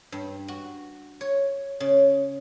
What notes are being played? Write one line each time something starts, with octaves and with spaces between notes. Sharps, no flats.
G2
F#4
C#5
C#3